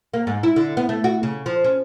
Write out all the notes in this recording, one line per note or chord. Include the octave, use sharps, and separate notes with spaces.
A#3
G#2
E4
D3
B3
A3
F#4
C#3
F3
C#4